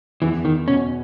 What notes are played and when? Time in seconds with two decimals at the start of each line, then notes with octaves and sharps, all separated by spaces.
0.22 E2 E3
0.45 D#3
0.67 B2 C#4